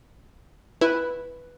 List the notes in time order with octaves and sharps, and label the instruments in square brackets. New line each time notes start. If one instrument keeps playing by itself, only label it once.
[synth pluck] E4 [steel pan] B4